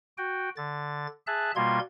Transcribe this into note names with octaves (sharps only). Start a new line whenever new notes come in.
F#4 G5
D3 A6
G#4 E5 A5 F#6
B2 G3 A#3 F4 C6 G#6